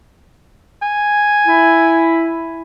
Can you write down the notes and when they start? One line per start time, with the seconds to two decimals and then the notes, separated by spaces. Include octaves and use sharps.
0.83 G#5
1.47 E4